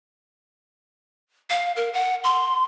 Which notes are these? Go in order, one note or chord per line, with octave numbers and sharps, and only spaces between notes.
F5
A#4
F#5
C6